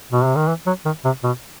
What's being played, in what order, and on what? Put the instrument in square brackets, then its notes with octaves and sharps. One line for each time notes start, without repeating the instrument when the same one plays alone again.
[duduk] B2
C3
D#3
E3
F#3
D#3
C3
B2